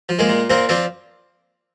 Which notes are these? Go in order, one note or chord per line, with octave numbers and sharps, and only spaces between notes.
F3
G#3 A#3
A#2
A#2 A#3 C4
F3 C4 D4